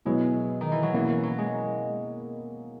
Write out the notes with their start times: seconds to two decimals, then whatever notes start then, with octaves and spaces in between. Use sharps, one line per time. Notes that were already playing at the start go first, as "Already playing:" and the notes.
0.05 B2 F#3 G#3 B3 E4
0.61 D#3
0.72 E3
0.83 F#3
0.93 B2 E3 A#3 C#4 E4
1.08 E3
1.23 F#3
1.38 G#3